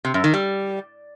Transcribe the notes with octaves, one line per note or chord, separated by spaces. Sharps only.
C3
F#2
D#3
G3